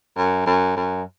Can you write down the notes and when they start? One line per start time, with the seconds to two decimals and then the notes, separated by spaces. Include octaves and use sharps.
0.17 F#2
0.46 F#2
0.76 F#2